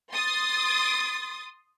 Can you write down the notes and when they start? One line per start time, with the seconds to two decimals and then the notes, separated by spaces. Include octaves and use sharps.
0.13 C6 D#6 A6